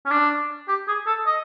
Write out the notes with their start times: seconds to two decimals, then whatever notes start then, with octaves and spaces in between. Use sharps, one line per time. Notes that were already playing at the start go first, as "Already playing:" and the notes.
0.06 C#4
0.11 D4
0.68 G4
0.88 G#4
1.07 A4
1.27 D#5